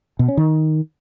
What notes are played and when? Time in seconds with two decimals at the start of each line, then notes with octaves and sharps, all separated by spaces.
0.19 B2
0.28 C#4
0.37 D#3